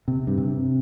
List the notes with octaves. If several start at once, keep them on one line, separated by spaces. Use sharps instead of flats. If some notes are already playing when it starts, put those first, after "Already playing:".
C3
G2
C3